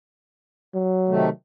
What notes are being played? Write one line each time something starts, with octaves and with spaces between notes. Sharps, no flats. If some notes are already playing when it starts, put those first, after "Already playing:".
F#3
C3 D#3 A3